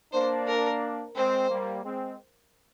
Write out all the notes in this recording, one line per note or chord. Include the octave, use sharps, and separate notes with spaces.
A#3 D4 C5
A#4
G#3 C4 C5
G3 A#3
G#3 C4